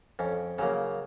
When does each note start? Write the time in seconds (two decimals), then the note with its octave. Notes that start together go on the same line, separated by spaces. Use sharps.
0.19 F2 C#4
0.58 C#3 F#3 A#3 C#4